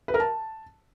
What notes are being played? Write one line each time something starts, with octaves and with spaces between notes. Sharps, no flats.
B4
A#4
A5